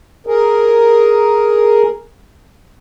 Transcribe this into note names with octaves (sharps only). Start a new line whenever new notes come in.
G#4 A#4